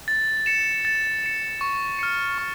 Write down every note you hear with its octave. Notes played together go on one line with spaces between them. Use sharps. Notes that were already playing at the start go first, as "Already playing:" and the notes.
A6
C#7 E7
A6
C#7 E7
C#6
F6 C#7
C#6